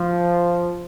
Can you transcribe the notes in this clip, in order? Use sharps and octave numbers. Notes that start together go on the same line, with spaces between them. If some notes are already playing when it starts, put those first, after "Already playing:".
Already playing: F3